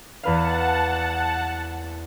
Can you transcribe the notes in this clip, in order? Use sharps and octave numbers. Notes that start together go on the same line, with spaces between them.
E2 B4 F5 F#5 A5